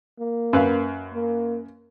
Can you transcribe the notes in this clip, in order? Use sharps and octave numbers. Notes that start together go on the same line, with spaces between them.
A#3
F#2 B4 F5
A#3